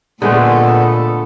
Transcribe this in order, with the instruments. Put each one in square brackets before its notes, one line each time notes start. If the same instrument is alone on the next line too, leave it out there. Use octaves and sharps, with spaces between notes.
[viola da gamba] A#2 A4 [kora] D3 G#3 A3 [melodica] B3